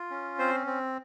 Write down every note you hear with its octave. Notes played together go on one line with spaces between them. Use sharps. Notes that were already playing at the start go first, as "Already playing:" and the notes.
Already playing: F4
C#4
C4 C5
C4